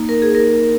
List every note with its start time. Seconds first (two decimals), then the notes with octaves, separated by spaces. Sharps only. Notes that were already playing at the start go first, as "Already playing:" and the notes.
Already playing: A#3 D#4
0.09 A#4
0.22 G#4
0.35 A#4